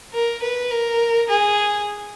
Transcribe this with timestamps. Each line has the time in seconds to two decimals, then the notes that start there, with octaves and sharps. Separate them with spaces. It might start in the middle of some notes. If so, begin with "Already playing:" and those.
0.13 A#4
0.42 B4
0.71 A#4
1.29 G#4